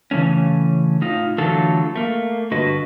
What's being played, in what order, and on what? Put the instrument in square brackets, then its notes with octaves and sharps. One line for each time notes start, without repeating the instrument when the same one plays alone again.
[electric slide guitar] C#3 E3 A3 C#4
A2 D#4 F4
D3 E3 F#3 A3 F4 A4
A3 A#3
G2 D3 F#4 B4 D#5